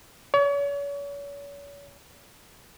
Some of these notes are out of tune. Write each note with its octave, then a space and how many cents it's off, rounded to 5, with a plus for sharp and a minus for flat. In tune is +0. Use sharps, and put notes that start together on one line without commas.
C#5 +40